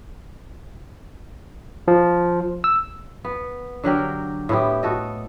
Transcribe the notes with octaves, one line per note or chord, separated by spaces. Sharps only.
F3
E6
B3
D3 F#3 G4 A#4
A2 B3 E4 G4
F#4 A4 D#5